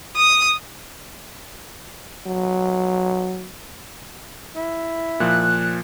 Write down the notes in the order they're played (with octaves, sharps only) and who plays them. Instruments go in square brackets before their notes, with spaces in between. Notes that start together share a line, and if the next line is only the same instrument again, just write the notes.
[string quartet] D#6
[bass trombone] F#3
[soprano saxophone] E4
[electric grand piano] A#2 F3 [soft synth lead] F#6